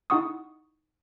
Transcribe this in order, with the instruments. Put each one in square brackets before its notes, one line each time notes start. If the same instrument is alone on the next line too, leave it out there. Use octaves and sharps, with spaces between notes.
[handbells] D#4 E4 F#5 C#6 D#6